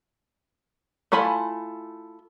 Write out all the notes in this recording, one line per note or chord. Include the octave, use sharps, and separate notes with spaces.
A3 E4 F4 G#5 B5